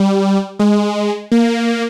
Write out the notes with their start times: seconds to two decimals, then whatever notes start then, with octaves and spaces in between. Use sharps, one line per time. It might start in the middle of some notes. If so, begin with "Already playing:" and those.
Already playing: G3
0.59 G#3
1.32 A#3